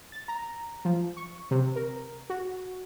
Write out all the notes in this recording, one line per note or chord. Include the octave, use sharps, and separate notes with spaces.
A6
A#5
F3
C#6
C3
A#4
F#4